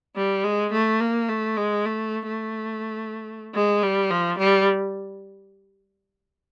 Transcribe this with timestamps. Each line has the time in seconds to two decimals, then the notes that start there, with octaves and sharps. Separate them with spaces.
0.16 G3
0.44 G#3
0.72 A3
1.00 A#3
1.29 A3
1.57 G#3
1.85 A3
2.27 A3
3.54 G#3
3.82 G3
4.11 F3
4.39 G3